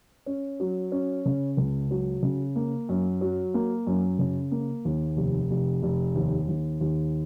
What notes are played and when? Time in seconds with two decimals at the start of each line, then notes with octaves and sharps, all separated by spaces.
0.26 C#4
0.60 F#3
0.92 C#4
1.26 C#3
1.57 C#2
1.91 F#3
2.22 C#3
2.56 A#3
2.89 F#2
3.21 F#3
3.54 A#3
3.87 F#2
4.19 C#3
4.51 A#3
4.85 D#2
5.17 F1
5.51 F1
5.83 F1
6.15 D#2
6.49 D#2
6.81 D#2